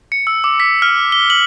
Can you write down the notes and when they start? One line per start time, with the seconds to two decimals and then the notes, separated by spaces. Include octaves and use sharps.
0.12 C#7
0.27 E6
0.44 D6
0.60 B6
0.82 F6
1.12 G7
1.30 F#7